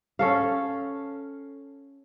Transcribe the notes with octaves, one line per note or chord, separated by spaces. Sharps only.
C#4 A4 F5